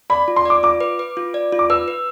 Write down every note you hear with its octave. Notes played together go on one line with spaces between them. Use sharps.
D5 B5
F4
C6
D5 D6
F4 D6
B4
B4
F4
D5
F4
D6
B4 E6
B4